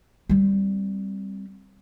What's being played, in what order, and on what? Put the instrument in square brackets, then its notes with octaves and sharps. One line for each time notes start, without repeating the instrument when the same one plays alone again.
[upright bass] G3 C4